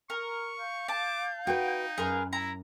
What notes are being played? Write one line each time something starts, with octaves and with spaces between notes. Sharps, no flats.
A#4 C#6
F5 G6
A5 D6
D#4 F#4 B4 G5
F#2 G#4 A#4 B4
E4 A#5